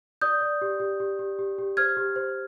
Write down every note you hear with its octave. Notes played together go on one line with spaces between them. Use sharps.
D5 D#6 G6
D5
G4
G4
G4
G4
G4
G4
C5 F6 G#6
G4
C5